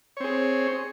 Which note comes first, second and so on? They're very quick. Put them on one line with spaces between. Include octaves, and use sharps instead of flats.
C#5 C4 G#4